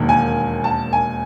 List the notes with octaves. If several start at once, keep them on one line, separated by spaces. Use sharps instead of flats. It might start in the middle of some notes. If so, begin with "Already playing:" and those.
Already playing: E1 D#2 D#3
G#5
A5
G#5